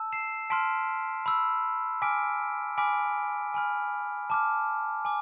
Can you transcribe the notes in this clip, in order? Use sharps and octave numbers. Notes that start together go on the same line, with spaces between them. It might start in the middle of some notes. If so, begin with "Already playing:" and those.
Already playing: A5 E6
C7 E7
A5 C6 F6 B6 D7
B5 E6
G#5 D6 F6 B6 D7
G#5 B5 D6 F6 B6 D7
G#5 B5 F6
A5 D6 F6
G#5 D6